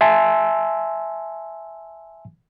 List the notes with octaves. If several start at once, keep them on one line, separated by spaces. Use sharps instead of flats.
E5 G#5 A5 C6 E6